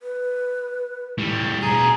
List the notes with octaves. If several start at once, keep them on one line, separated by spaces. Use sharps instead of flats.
B4
A2 G3
B2 G#4 A#5